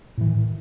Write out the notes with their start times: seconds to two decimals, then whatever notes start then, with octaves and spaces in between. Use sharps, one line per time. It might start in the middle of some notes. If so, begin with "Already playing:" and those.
0.18 A2
0.21 E3
0.25 D#3